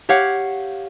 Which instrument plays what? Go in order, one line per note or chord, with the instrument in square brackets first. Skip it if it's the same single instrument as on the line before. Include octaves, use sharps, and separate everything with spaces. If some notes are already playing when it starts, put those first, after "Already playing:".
[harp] G4 C#5 F5 F#5